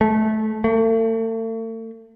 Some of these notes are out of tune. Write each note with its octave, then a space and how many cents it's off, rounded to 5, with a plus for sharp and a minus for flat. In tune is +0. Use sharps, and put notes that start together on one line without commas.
A3 -20
A3 +40